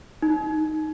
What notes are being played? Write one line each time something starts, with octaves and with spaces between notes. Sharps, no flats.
D#4